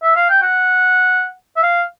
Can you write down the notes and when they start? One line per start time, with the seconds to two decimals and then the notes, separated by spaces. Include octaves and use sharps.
0.03 E5
0.16 F5
0.29 G5
0.42 F#5
1.57 E5
1.63 F5